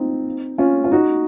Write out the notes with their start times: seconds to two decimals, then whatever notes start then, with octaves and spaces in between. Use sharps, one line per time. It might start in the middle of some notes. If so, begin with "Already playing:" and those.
Already playing: C4 D#4 F4
0.58 C#4 F4
0.84 F4
0.92 D#4 F#4